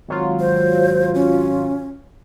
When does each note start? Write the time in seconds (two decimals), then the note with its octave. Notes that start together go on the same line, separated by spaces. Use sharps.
0.08 G#1 F#3 F4
0.40 C5
1.14 C#4